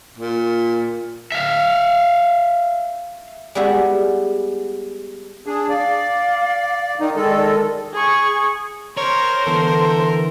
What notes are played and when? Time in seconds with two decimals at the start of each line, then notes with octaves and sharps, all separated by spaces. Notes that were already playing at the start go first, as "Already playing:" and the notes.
0.18 A#2
1.32 E5 F5
3.55 G3 G#3 B3 E4 F#4
5.47 D4 G#4
5.69 D5 F5
7.00 D#3 D#4 D5
7.16 D#3 G#3 A4
7.93 G#4 C#6
8.97 A#4 C5 C#5 A#5
9.46 D3 E3 B3 A4